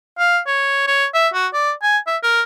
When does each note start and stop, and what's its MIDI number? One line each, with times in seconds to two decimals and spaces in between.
0.19 0.39 77
0.47 0.85 73
0.87 1.06 73
1.14 1.28 76
1.34 1.47 66
1.54 1.72 74
1.83 1.98 80
2.07 2.17 76
2.23 2.42 70